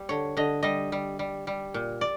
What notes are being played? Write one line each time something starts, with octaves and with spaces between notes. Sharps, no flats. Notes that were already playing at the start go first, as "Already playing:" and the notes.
Already playing: G3
D3 C#5
D3 D#5
G3 D#5
G3
G3
G3
A#2
D5